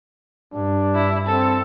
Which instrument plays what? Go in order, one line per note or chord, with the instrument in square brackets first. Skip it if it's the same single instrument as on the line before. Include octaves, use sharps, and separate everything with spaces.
[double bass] G2 [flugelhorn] D4
[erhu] E4
[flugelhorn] C4 [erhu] A4